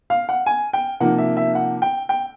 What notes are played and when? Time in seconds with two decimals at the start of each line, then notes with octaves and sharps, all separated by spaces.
0.10 F5
0.29 F#5
0.46 G#5
0.73 G5
1.00 C3 F3 A#3 D#4 F#5
1.18 E5
1.37 E5
1.55 F#5
1.82 G5
2.09 G5